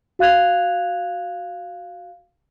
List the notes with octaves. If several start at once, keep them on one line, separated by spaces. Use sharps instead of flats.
F#4 F5 F#6 G#6 F7